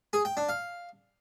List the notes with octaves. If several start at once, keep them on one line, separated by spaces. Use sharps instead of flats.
G#4
G5
D4
F5